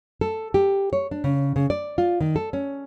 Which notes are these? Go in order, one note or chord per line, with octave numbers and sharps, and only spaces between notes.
A4
G4
C#5
D4
C#3
C#3
D5
F4
D#3
A4
C#4